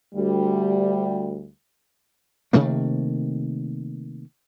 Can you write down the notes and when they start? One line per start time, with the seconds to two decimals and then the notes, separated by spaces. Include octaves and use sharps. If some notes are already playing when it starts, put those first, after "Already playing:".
0.15 D2 G3
2.53 C3 D#3 A3 A#3